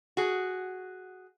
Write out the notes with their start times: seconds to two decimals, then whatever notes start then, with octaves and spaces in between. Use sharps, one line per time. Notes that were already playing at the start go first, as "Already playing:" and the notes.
0.17 F#4 G#4